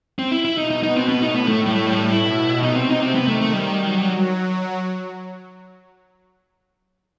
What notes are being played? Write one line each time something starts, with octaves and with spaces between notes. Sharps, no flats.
C4
E4
E4
B2 D#4
D#4
D#4
C4
A2 B3
D#4
B3
A3
G3
A3
G3
A3
G3
B2 E4
C3 D#4
C4
D#4
C4
D#3 B3
A3
A3
G3
F#3